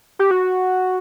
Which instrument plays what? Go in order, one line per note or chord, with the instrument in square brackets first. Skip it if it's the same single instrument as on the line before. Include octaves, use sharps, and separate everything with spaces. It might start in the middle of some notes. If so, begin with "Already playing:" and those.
[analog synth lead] G4
F#4